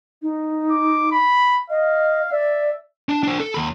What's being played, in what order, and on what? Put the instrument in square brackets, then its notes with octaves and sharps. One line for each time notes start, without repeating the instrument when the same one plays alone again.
[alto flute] D#4
[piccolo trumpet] D6
B5
[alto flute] D#5 [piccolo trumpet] F5
[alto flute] D5 [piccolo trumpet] E5
[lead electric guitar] D4
D4 C5
A4
D#2 B5